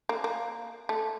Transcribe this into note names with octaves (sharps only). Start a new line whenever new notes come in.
A#3
A#3
A3